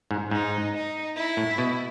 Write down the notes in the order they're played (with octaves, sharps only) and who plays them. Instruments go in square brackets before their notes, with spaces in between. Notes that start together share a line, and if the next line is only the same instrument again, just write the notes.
[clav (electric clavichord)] G#2
[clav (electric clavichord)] G#2 [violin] D#4
[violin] D#4
E4
[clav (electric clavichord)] A2
B2